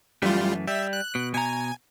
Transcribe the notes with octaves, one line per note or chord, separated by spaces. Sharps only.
F#2 E3 G3 A3 F4
G3 E5
F#6
B2
B2 G#5 A#5